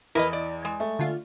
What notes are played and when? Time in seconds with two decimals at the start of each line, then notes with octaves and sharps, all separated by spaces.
0.15 E2 E4 A#4 B4 D#5
0.33 D5
0.65 G#3
0.80 A3
0.99 D3 F4